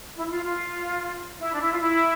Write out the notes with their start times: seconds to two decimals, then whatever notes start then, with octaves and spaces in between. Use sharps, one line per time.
0.16 E4
0.26 E4
0.30 F4
0.44 F4
1.40 E4
1.53 D4
1.60 E4
1.72 F4
1.81 E4